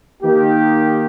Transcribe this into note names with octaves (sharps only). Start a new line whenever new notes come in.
D#3 A#3 D#4 G4